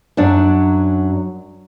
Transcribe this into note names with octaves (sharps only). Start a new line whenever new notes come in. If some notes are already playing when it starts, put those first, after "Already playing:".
F#2 F#3 D4